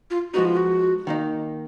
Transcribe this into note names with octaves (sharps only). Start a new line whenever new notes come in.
F4
F3 G#3 B3 D#4 F#4
F4
F#4
D#3 A#3 D#4